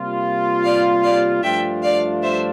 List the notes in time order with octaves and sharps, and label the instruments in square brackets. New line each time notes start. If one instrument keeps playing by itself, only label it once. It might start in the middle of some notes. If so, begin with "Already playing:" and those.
Already playing: [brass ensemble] C3 G3 A#3 F4
[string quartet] D5 F5
D5 F5
[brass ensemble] G2 F3 A3 D4 F4 [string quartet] E5 G5
[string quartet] D5 F5
C5 E5